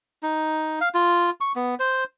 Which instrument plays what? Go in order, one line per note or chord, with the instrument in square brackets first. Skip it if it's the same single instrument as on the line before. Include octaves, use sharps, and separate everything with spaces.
[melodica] D#4
F5
F4
C#6
B3
C5